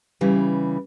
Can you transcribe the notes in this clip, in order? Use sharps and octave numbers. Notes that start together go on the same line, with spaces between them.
C#3 E3 G3